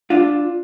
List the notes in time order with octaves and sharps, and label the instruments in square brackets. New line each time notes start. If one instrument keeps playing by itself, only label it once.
[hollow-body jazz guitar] D4 F4